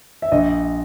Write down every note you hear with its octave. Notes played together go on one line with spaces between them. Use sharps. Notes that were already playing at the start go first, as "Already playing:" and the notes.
E5
A#1 D#5